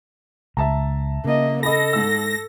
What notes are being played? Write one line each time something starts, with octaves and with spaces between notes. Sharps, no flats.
C#2 E5 A5 A#5
C#3 A#3 D#5
A4 D#5 B5 A#6
G#2 E6